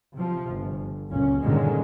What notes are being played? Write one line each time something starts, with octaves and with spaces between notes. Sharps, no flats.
C3 F3
G1
F#1 C#2 A#2 C#4
G2 A#2 D3 D#3 G#3 C#4